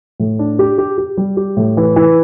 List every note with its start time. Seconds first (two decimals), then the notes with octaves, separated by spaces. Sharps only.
0.20 A2
0.39 D4
0.59 G4
0.78 G4
0.98 G4
1.17 G3
1.37 G4
1.57 A2
1.77 E3
1.96 E3